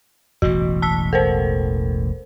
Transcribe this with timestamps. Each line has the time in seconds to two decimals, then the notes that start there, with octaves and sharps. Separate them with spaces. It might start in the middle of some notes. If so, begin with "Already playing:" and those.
0.42 E1 A1 E3 F#4
0.82 A5 E6 B6
1.13 A4 A#4 C5